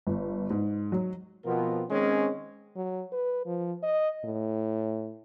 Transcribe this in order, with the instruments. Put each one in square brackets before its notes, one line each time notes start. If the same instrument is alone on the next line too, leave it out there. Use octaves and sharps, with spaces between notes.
[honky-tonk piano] G1
G#2
F#3
[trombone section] B2 F3 B3 C4 F4 A#4
D#3 G#3 C4 C#4
[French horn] F#3
B4
F3
D#5
A2